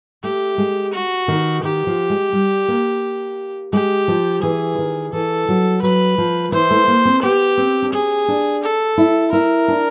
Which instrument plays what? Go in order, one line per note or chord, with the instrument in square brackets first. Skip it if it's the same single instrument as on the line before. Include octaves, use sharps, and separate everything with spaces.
[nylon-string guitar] A3 [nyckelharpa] G4
[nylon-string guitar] G#3
[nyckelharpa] F#4
[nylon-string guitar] D#3
[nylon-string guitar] D#3 [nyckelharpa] G4
[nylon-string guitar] F3
G#3
G3
A#3
[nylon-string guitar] G#3 [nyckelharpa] G4
[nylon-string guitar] F3
[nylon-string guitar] E3 [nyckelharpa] G#4
[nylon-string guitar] D#3
[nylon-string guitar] E3 [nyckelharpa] A4
[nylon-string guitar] F#3
[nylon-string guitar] F#3 [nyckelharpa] B4
[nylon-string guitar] F3
[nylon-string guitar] E3 [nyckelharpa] C5
[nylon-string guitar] A3
A#3
C4
[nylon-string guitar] B3 [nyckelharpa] G4
[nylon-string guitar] C4
D4
[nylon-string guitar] C#4 [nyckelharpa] G#4
[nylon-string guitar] D4
[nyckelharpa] A4
[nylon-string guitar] E4
[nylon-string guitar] E4 [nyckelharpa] A#4
[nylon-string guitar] D4